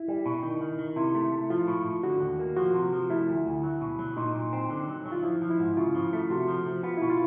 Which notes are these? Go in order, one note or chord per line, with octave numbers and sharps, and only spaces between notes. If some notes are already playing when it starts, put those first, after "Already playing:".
Already playing: E4
G3
B2
D#3 D#4
D#3
D#3
C3 E4
A3
A3
F3 F4
A2
A2
D3 F#4
D#2
A#3
F3 F#4
C3
F3
A3 E4
D2
D2
F#3
B2
F#3
A#2 D#4
A#2
C4
D3
F#3
F#3
F4
F3 E4
F3
E4
G#2
C#3 F4
F3
A3
C3 F#4
F3
F3
B3 F4
B2 E4
F4